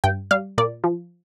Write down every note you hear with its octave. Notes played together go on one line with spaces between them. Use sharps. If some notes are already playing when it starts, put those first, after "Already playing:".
G2 G5
G3 F5
A#2 D5
F3